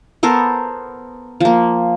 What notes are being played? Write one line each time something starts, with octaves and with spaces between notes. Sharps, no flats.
B3 A4 A#4 C5
F3 A#3